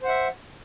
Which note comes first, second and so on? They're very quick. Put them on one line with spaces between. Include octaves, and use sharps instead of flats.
C5 F#5 E5